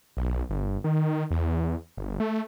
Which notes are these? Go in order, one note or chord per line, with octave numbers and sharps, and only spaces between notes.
B1
G1
D#3
E2
G1
A3